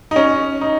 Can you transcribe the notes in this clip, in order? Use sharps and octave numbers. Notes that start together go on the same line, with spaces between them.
D#4
C#4
D#4